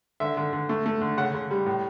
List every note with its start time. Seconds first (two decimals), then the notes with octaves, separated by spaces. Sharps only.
0.20 D3 E5
0.37 D3
0.53 D3
0.69 A3
0.86 A3
1.01 D3
1.17 C#3 F#5
1.34 C#3
1.51 G3
1.66 A2